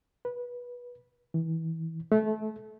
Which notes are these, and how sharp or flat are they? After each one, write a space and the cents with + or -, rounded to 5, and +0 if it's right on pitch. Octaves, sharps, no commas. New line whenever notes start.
B4 -20
E3 -25
A3 -25